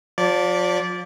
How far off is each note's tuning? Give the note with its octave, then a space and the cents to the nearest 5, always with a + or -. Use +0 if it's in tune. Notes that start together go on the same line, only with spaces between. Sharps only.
F3 +35 D5 -15